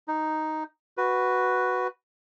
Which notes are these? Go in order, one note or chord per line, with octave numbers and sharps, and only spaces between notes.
D#4
F#4 B4